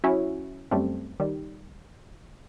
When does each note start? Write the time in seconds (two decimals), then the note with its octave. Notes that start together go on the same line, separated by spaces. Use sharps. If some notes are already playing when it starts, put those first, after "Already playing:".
0.04 F#3 C#4 E4 F#4
0.71 F#2 G3 A3 C4
1.20 D#3 G3